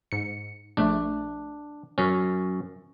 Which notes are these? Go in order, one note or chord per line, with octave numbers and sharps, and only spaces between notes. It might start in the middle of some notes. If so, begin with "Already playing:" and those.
G#2 C#7
A#1 A3 D4
F#2 C#4